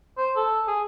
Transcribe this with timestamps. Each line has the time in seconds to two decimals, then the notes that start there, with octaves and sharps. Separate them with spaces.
0.18 C5
0.36 A4
0.67 G#4